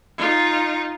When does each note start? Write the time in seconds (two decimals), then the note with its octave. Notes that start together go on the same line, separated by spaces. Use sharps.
0.18 D#4 F4